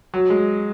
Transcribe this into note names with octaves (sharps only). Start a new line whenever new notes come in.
F#3
G#3